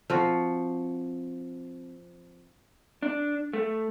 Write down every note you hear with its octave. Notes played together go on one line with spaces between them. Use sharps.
F3 C4 F#4
D4
A3